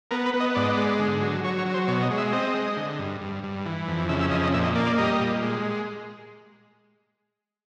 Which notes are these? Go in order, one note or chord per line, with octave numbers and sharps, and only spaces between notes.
B3 A#4
B4
B3
D#5
G#2 D5
D#5
G#3 D5
D3
F#3
F#3 C#5
C#5
F#3
C5
B2 C#5
D#5
G#3
E5
C4 D#5
G#3
D3
G2
G2
G2
E3
F2
C#3 E5
E5
F2 D#5
D#5
A#2 E5
D#5
A#3 D5
D5
G3 D#5
A#2
G#3